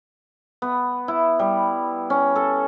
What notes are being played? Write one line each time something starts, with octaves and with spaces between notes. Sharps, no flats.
B3
E4
G3
C#4
A4